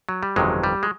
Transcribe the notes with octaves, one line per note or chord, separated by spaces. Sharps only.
F#3
G3
G1 F2 C3 D#3 F#3 G#3
G3
G#3